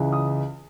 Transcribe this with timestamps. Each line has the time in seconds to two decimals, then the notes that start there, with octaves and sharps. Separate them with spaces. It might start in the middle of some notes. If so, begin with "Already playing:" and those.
Already playing: C#2 C#3 E3
0.13 D#6